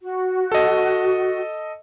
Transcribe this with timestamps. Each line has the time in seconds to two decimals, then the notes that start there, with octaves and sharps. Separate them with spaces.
0.01 F#4
0.52 A4 D#5